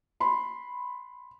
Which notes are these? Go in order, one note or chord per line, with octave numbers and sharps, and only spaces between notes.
B5 C6